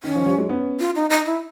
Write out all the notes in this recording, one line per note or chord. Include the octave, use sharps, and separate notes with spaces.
D#3 C#4
D#3 F3
F3 G3
F#3 G#3
B3 C#4
F4
D#4
D#4
E4